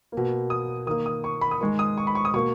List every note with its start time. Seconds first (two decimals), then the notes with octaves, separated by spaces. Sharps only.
0.12 B2 A#3
0.50 D#6
0.87 D#3 A#3 D#6
1.06 D#6
1.24 C#6
1.41 B5
1.51 D#6
1.61 D#3 G#3 C#6
1.79 D#6
1.98 C#6
2.07 B5
2.15 C#6
2.25 D#6
2.34 B2 A#3 C#6